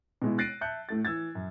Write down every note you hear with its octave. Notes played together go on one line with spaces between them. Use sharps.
B2 G#3 E4
F#6 A6 A#6 C7 D7 D#7
E5 A5 F#6 G6 C#7
A2 A3 A6
E3 E6 G#6 A6
F#2